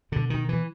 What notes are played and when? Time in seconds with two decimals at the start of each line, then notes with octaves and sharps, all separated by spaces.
0.12 B2 D3
0.30 D#3
0.49 E3